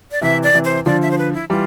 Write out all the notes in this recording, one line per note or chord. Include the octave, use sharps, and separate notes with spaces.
D5
C3 E3 E5
D5
C3 E3
C5
D3 F3 D5
E5
C5
B4
E4
E3 G3 F4